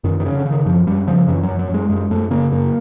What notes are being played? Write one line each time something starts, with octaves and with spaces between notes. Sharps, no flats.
F#2 D#3
D#3
C#3
D3
C#3
D#3
F#2 F3
F#2 G3
C#3 F3
F#2 E3
F#2 F#3
F#3
F#2
G#3
F#2 G#3
F#2 A3
C#3 A#3
F#2 A#3